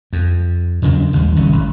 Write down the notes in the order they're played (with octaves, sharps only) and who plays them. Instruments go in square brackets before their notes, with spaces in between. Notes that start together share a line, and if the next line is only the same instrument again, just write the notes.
[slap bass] F2
E2 C#3 F#3 D4
G#1 D#2 G3
F#1 C2 C#4
G#1